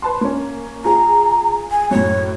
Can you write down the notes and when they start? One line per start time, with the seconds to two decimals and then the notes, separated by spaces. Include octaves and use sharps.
0.02 B4 A5 C6
0.21 A#3 C#4
0.85 F4 G#4 A#5
1.71 G#5
1.91 F#2 A2 C#5